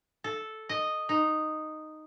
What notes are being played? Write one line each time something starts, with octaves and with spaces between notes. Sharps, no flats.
A4
D#5
D#4